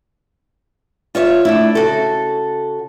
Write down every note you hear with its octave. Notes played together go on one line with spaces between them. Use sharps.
F4 C#5 D5 E5
A3 D4 E4
C#3 F#4 A4